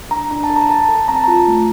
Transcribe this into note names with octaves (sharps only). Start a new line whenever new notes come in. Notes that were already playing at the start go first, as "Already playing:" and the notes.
D4 A#5
D4 A#5
A5
A4
A#5
A4 A5
A4
C4 A#5
A5
F4 A#5
A3